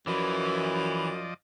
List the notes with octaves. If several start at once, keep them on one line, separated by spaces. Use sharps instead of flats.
F#2 E3 F3 D5 D#5